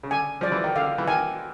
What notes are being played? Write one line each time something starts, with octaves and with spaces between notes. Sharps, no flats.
C#3
D3 G#5
F3 D5
E3
D#3
D3 F5
E3
D#3 G#5